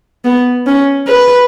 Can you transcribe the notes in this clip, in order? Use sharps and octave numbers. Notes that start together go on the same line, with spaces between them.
B3
C#4
B4